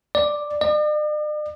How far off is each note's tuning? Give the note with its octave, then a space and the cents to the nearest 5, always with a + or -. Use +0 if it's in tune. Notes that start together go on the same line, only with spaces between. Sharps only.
D5 +5
D5 +45